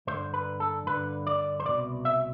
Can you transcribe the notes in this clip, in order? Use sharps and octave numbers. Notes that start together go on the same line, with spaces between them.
G2 D3 C5
B4
A4
G2 D3 B4
D5
C5
C2 B2 D5
E5